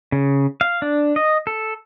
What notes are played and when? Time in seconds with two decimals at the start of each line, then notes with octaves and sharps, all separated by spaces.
0.12 C#3
0.61 F5
0.82 D4
1.16 D#5
1.47 A4